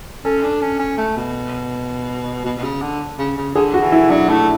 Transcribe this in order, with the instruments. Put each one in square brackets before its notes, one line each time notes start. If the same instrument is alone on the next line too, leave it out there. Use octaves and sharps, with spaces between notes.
[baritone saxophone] C#4 [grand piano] A4
[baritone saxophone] D4
C#4
C#4
A3
B2
B2
B2
C#3
D3
C#3
C#3
[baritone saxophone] D3 [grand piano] G#4
[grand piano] F#4
[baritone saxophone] E3
[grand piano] E4
[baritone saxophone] F#3 [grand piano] D4
[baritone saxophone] A3 [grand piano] E4